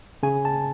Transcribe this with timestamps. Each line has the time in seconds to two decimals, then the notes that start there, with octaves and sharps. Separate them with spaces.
0.23 C#3 G#5
0.45 A5